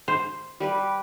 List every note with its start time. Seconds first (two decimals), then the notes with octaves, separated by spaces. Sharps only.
0.08 C5
0.60 G3 G4 B4